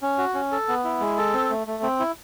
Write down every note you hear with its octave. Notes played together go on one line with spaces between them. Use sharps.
C#4
F#4
C#4
A4
B3
E4
G#3
A4
C4
A3
A3
C4
E4